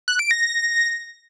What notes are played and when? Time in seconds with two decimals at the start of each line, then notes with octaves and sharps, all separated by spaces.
0.08 F#6
0.19 D7
0.31 A#6